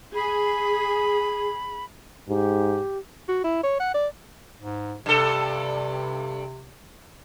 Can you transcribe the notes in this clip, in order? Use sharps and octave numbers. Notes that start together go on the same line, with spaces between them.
G#4 B5
G#2 G4
F#4
E4
C#5
F#5
D5
G#2
G2 C3 A4